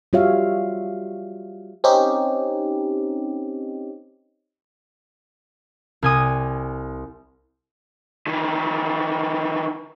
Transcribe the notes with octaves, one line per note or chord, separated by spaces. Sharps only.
G3 F4 F#4 C#5 E5 F5
C4 C#4 D#4 G4
C2 G#5 D#6
D#3 E3